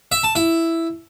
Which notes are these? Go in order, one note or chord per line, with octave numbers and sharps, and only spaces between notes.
E5
A5
E4